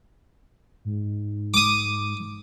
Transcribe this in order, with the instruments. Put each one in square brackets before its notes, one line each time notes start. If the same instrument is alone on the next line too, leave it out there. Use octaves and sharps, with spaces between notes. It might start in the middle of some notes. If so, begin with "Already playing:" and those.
[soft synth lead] G#2
[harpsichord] D6 D#6